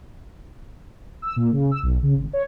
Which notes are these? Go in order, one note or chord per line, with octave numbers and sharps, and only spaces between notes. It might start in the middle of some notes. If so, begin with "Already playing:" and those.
E6
A#2
C#3
E6
B1
C#3
G#1
C#5